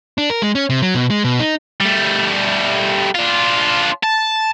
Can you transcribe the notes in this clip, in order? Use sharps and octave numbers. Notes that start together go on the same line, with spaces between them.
D4
A#4
G#3
C#4
C3
F#3
B2
G#3
B2
D#4
G3 A3
D4 F4
A5